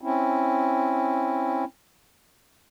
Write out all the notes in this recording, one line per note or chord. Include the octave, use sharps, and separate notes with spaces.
C4 C#4 E4